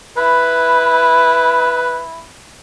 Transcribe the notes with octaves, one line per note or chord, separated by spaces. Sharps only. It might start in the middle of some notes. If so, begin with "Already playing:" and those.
E4 B4